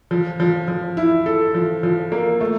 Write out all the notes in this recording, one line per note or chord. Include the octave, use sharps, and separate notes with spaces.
F3
F3
F3
E4
A4
F3
F3
A#3
A3